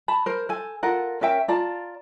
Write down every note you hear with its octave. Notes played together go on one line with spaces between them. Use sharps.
A5 B5
A#4 C5
A4 G#5
F4 A4 A#4 F#5
C#4 A#4 E5 G5
F4 D5 A5 A#5